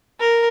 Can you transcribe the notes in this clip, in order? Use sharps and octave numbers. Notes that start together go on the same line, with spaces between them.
A#4